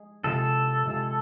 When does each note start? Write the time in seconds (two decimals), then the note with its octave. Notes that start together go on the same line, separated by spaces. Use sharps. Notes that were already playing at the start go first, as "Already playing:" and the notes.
Already playing: G#3 G#4
0.23 C3 G#3 C4 F4 G#4 A4
0.85 C3 G#3 C4 F4 G#4